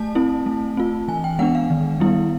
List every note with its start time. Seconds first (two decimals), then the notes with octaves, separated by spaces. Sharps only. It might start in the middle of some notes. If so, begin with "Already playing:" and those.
Already playing: A3 A5
0.15 C4 E4
0.46 A3
0.77 C4 F4
1.08 E3 G#5
1.24 G5
1.39 G#3 B3 D4 F#5
1.55 F5
1.70 D#3
2.00 G3 B3 E4